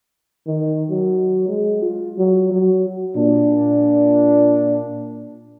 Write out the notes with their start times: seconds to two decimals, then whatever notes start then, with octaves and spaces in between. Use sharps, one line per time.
0.47 D#3
0.90 F#3
1.49 G#3
1.82 F4
2.18 F#3
2.52 F#3
3.16 A#2 D4